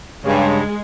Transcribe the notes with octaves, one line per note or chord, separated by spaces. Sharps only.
G2 C#3 G#3